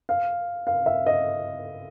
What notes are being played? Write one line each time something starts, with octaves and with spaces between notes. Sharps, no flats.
F5
F5
E5
D#5